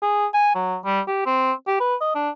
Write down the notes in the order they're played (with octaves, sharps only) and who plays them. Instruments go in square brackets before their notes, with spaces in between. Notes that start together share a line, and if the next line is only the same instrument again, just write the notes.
[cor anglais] G#4
G#5
F#3
G3
G4
C4
G4
B4
D#5
D4